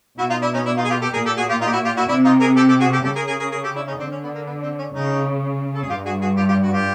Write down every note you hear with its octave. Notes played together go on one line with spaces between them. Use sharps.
B2 E4 F#4
D#4 F4
D4 E4
C#4 D#4
D4 E4
D#4 F4
G#4
F4 G4
G4 A4
A#2 G#4 A#4
G4 A4
F#4 G#4
F4 G4
D#4 F4
G4
E4 F#4
F4 G4
E4 F#4
C3 D4 E4
D#4 F4
G#4 A#4
G4 A4
G4 A4
F#4 G#4
G4 A4
C#3 G4 A4
G#4 A#4
G#4 A#4
G#4 A#4
G#4 A#4
G4 A4
D4 E4
C#4 D#4
D3 C4 D4
C#4
B3
A#3
B3
C4
C#4
C#3 C#4 D#4
A4
G#4
G2 F4 G4
F#4 G#4
F#4 G#4
F4 G4
F4 G4
F#4
F4 G4